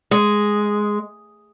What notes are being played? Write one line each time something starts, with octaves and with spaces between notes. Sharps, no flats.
G#3